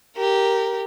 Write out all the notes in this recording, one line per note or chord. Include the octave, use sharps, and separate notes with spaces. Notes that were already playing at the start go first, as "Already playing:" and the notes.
G4 A#4